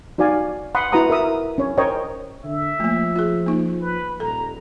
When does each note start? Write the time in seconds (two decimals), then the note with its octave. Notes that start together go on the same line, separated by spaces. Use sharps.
0.18 D#4 F#4 D5 F5 G#5
0.75 F#5 B5 C6 D#6
0.92 E4 F#4 B4 F#5 A#5 D#6
1.10 A#4 E5 D#6
1.58 C#4 C#5
1.78 A#4 C5 C#5 D#5 G5
2.44 D3 E5
2.80 F3 A3 A#3
3.16 F4 G#4
3.46 A#3 D#4
3.81 B4
4.20 D#1 A4 A#5